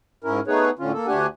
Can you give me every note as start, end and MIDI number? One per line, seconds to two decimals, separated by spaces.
0.24 0.40 44
0.24 0.40 61
0.24 0.40 64
0.24 0.40 70
0.47 0.70 57
0.47 0.70 59
0.47 0.70 63
0.47 0.70 68
0.47 0.70 71
0.47 0.70 73
0.79 0.92 45
0.79 0.92 50
0.79 0.92 61
0.79 0.92 65
0.93 1.07 58
0.93 1.07 69
1.07 1.26 38
1.07 1.26 57
1.07 1.26 62
1.07 1.26 67
1.07 1.26 78
1.07 1.26 80